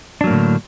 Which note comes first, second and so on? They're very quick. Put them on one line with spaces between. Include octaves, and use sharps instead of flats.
D4 F#3 A#3 A2 D3